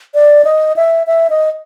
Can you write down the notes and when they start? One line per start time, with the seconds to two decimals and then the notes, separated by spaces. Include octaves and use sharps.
0.14 D5
0.45 D#5
0.76 E5
1.07 E5
1.30 D#5